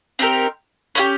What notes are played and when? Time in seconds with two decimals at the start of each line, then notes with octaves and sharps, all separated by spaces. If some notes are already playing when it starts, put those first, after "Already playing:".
0.19 C4 D#4 G4 A#4
0.95 C#4 E4 G4